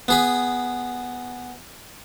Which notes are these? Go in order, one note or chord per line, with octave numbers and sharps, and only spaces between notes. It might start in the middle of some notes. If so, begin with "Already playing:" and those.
B3 G#4 B5